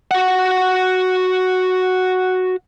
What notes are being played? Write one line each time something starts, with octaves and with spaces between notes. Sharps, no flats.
F#4 F#5